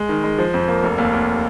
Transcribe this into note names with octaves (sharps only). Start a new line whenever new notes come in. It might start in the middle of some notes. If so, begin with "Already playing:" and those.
Already playing: G#3
D#3
G#3
F3
F2
A#3
F1
D#2
D#2